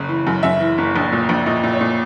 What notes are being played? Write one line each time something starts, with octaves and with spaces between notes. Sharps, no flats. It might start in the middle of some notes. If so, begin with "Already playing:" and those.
Already playing: F#1 C#3
E3
F#2
F#2 E5
E3
F#1
A#1
A#2
A#1
A#2 D#5
A#2
C#5
A#2